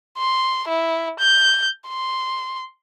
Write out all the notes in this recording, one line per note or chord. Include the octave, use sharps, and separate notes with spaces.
C6
E4
G6
C6